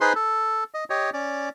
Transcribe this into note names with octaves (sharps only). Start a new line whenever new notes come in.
D#4 G#4 B4 C5 C6
A4
D#5
G4 C#5 D#5
C#4 D5